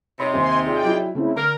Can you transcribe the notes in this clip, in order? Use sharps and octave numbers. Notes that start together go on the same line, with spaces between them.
C3 D#4 C#5 B5 C6
D#2 C4 G4 C5 G#5 C6
F4 G#4 D5 G5
F#3 E4
C#3 A3 C4 E4 C5
D3 A#4 A#5